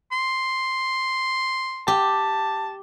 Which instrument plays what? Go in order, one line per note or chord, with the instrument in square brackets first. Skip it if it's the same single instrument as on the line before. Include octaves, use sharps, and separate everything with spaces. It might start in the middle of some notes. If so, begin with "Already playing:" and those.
[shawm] C6
[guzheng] G4 [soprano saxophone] A5